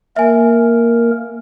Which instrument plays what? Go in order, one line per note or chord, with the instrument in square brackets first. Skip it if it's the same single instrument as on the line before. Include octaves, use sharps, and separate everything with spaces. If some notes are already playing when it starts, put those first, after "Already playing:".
[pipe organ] A#3 A#4 [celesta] E5 G#5